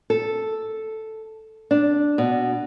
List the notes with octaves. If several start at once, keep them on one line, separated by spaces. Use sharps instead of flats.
A4
D4
B2